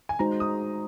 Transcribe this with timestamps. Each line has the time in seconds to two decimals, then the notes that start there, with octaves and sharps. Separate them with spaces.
0.09 G#5
0.19 G#3 D#4 F#4 C5 A#5
0.40 D#6